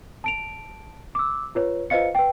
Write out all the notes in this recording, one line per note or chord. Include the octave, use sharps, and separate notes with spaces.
A5 D7 F7
D6 E6
F4 B4 C#5
F4 B4 C5 D#5 F5 C#7
B4 G5